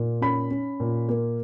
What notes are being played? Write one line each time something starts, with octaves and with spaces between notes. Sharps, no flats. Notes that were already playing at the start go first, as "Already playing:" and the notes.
Already playing: A#2
C#4 B5
C#4
A#2
A#3